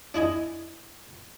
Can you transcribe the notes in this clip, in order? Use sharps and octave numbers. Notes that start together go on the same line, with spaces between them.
D4 E4 D#5 G#5